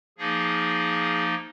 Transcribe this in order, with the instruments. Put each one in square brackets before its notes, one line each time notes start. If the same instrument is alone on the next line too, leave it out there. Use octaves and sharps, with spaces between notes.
[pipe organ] F3 A#3 D#4 G#4